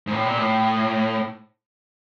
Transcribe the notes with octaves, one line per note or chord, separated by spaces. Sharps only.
G#2
A2
A#2
A2